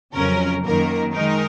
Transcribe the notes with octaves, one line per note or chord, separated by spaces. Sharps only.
F2 C#3 F#3 C#4 A#4
F#2 D#3 A#3 A#4
D#3 G#3 D#4 A#4